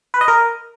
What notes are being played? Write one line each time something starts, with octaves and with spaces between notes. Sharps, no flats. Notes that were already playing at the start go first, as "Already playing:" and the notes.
B4
D#5
A#4